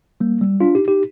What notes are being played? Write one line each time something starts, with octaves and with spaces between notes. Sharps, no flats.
G3 A#3
G3
D4 F4
D#4 G4
D#4 G4